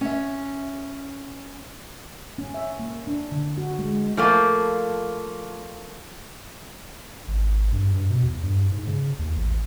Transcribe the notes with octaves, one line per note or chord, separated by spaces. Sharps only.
C#4 E5
C#4
E5
A#3
D4
D3
F#4
G#3
F3 A3 A#3
G#1
G2
G2
B2
E2
G2
G#2
C#3
D#2
A1